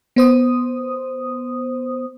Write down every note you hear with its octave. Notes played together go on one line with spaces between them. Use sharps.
B3 C5 D#6